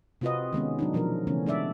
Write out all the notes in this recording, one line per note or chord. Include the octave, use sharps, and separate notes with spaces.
C3 C4 F4 F#4 B4 D#5
D#3 G#3 B3 C#4
F#3 D4 D#4
B2 F3 F#3 D4 A#4
C#3 E3 A3 B3 C#4
G#3 D4 D5 E5